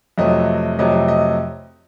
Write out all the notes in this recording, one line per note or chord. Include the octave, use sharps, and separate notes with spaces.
F2 C3 F#3 A3 D#5
F2 C3 F#3 A3 D#5
D#5